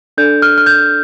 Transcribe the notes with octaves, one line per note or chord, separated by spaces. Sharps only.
D4 A4 D5 G6
F6
F6
G6